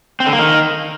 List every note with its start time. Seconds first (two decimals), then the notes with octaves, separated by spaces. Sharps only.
0.20 C4
0.26 D3
0.33 A#3
0.39 D#3